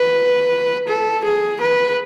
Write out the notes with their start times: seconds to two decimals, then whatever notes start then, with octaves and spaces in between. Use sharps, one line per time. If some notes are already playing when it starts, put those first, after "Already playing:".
Already playing: B4
0.88 A4
1.24 G#4
1.61 B4